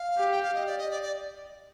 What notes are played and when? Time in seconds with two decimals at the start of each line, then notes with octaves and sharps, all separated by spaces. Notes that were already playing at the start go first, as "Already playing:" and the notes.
Already playing: F5
0.18 G4
0.32 G5
0.42 F5
0.54 D#5
0.66 D5
0.78 D#5
0.91 D5
1.02 D5